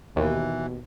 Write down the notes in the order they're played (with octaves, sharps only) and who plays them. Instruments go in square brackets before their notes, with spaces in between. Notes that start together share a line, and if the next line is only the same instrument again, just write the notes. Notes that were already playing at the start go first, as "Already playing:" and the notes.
[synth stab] D#2 [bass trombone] B2 [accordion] E3